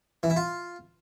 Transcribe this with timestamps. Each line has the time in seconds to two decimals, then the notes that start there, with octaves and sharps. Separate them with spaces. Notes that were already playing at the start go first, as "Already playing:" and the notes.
0.23 E3
0.30 E4
0.36 F4